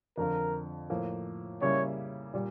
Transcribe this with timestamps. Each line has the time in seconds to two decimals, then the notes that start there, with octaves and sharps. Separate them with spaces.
0.18 F2 D3 F3 A#4
0.90 A2 F3 A#3
1.61 C#3 G3 A#3 E4 C#5
2.34 A#2 G3